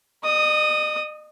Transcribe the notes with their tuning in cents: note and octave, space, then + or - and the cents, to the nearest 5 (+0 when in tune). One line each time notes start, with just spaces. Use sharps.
D#5 -40 D#6 +0